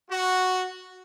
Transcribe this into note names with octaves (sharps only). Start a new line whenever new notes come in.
F#4